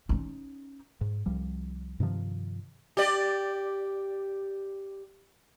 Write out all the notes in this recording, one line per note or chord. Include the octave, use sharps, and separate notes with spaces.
C#4 D#4
G#2
C2 F3 G3
G2 C3 D#3 F3
G4 D5